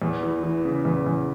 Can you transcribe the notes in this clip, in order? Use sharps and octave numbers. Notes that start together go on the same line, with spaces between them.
E2
E3
E3
C#3
E2
E2